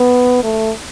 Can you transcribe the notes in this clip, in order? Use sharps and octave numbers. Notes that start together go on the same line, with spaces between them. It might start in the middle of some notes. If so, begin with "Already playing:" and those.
Already playing: B3
A3